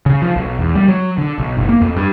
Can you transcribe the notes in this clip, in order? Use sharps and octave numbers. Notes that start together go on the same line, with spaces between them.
C#3
F3
B1
E2
G3
F#3
D3
B1
F#1
A#3
F2
G2